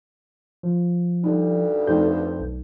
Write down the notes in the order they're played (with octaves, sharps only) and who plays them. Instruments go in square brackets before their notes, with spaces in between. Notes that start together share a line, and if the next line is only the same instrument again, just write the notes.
[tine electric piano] F3
[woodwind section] D2 G2 [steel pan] G3 D#4
[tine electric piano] F2 C5 G6 [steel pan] A3 D#4 G4
[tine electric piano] B1